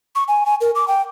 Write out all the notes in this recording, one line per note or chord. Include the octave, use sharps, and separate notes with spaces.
C#6
G#5
G#5
A#4
D6
G5